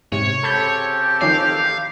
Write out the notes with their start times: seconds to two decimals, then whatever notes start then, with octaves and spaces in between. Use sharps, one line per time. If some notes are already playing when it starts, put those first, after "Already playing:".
0.12 G#2 C3 C#5
0.44 C#3 C4 G4 A4 A5 B5 G6
1.21 D#3 F3 C#4 F5
1.51 A1